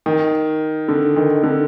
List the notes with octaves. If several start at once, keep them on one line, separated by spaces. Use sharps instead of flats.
D#3
D3
D#3
D3